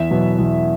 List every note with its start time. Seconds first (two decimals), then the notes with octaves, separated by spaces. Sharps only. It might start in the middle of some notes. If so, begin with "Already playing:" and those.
Already playing: E2 E5
0.11 B2 F#3 B3
0.39 E2